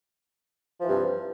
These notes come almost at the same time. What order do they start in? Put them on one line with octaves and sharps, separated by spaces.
F3 E3 G2 C3